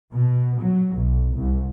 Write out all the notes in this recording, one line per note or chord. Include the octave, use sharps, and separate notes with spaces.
B2
F#3
B1
C2